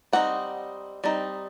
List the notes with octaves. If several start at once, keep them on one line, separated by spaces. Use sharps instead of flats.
G3 C4 D#4 F#5
G3 C4 D#4